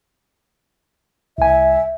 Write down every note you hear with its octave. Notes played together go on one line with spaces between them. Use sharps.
C2 E5 G#5